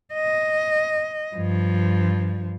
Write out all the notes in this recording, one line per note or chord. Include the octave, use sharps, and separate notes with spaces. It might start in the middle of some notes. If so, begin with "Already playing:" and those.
D#5
G2 F3